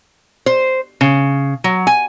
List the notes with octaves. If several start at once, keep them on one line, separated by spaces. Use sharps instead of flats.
C5
C#3
F#3
G#5